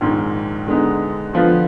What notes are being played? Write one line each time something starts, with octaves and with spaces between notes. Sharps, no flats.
A#1 G#2 D#3
D3 G#3 B3 D#4
D3 F3 B3 F4 B4